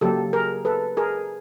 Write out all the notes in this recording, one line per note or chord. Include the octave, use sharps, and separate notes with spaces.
C#3 F#3 A#3 G4 A4
G#4 A#4
A4 B4
G#4 A#4